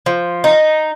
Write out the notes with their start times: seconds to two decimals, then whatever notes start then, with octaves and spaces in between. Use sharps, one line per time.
0.06 F3
0.44 D#4